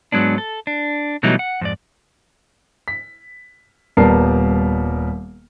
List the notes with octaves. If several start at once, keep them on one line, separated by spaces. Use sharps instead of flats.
G#2 F#3 G#3 B3 D4
A4
D4
B2 E3 F#3 G3 A3 D#4
F#5
F2 G#2 D5
B6
D#1 G3 B3 A#4 A5 C7